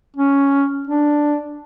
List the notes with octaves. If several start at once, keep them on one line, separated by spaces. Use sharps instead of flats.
C#4
D4